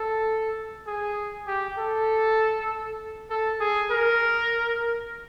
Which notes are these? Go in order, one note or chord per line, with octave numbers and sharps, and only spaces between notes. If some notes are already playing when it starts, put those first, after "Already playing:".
Already playing: A4
G#4
G4
A4
A4
G#4
A#4